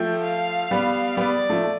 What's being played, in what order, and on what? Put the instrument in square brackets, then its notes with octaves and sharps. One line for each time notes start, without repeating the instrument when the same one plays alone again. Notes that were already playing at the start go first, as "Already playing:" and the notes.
Already playing: [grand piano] F3 A3 [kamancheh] G5
[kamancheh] F5
[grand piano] G3 B3
[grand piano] G3 B3 [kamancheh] D5
[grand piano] F3 A3